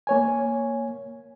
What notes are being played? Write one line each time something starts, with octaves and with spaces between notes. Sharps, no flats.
A#3 C#5 G#5